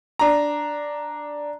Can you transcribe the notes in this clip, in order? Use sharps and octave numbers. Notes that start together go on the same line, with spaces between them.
D4 A#5